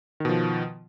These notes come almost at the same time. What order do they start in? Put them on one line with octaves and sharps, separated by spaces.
D#3 B2 F3